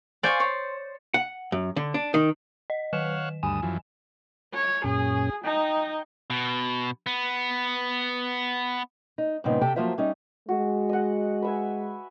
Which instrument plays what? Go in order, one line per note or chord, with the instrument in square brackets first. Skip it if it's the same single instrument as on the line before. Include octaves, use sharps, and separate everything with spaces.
[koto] C5 D5 [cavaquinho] F5 G#5 C#6
[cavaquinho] C#5
[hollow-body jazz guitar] F#5
F#2
D3
D4
D#3
[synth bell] D#5
[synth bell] D#3 E7 [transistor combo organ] C#5 F5 F#5
[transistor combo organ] D2 G2 D#6 [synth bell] G#5
[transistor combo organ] F#2 E3 F3
[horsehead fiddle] C#5
[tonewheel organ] F#2 A#2 C#4 [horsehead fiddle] G#4
[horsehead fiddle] D#4 [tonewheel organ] G5
[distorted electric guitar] B2
B3
[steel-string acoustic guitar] D#4
G2 A#2 C#3 B3 C4 D#4
C3 G4 A4 G5
F3 F#3 A#3 F4 C5 E5
G3 C#4 D#4
[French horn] G#3 [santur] F#4
[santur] D#5 F#5
B4 E5 G#5